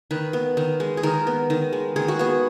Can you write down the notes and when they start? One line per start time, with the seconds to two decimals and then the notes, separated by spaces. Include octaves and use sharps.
0.11 D#3 B4
0.33 B3
0.57 D#3
0.80 G#3
0.97 G#4
1.03 D#3 A#4
1.27 B3
1.50 D#3
1.73 G#3
1.96 D#3 G#4
2.08 F#4
2.19 B3 G#4